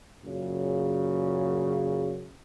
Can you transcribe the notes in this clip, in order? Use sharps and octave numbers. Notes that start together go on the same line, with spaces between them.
F#2 A#2 C#3